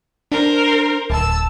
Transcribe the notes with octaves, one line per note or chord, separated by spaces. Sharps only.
D4 A#4 C5
D1 A5 E6